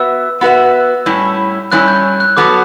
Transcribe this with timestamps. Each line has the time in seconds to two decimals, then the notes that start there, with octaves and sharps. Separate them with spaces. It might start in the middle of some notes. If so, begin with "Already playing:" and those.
Already playing: B3 F#4 B4 E5 E6
0.41 B3 F#4 B4 E5
1.06 A2 G3 C#4 E4
1.72 A2 G3 C#4 E4 F#6
1.88 G6
2.20 F#6
2.37 F#3 B3 F#4 A4 D6